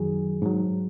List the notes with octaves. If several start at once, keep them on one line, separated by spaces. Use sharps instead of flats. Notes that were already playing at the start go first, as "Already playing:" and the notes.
Already playing: F#2 D#3 F#3 G#4
G#2 F#3